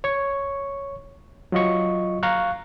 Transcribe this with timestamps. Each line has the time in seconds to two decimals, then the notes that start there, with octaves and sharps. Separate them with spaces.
0.04 C#5 C#6
1.52 F#3 F4 D#5 C#6
2.23 F5 A#5 C#6 F#6